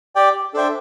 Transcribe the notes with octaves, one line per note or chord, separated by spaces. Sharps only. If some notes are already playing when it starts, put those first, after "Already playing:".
G4 D5 G5
D4 A4 C5 E5 G5